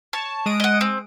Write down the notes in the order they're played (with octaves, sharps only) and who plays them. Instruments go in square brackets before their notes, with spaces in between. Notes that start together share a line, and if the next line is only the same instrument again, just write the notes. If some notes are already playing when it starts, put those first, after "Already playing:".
[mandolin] C#5 [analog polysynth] A5
[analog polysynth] G#3 D#6 D7
[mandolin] D#5 F#5
C4